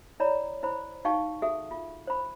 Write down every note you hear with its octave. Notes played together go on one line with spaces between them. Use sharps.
E4 C#5 D5 A#5 B5
E4 C5 B5
D#4 F#4 F5 G5 A5 C#6
F#4 G#4 A4 E5
F4
C5 B5